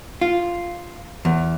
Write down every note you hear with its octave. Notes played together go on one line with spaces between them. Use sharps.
F4
E2